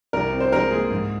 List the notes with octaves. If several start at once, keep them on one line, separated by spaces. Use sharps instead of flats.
C2 A#4
C4
C5
G#3 A#4
A#2 G#4
G#2